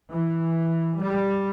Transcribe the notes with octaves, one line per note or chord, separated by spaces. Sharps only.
E3
G3